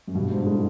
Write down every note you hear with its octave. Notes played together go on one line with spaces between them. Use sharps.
F#2
G2 B2
G#2 D4
A2 G#3